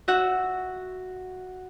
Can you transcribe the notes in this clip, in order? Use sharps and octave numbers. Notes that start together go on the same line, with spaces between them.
F#4 E5 F#5